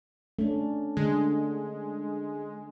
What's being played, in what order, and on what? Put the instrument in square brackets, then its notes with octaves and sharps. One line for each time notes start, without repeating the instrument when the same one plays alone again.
[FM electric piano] A3 [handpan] C#4 D4
[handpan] D3 [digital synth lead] G#3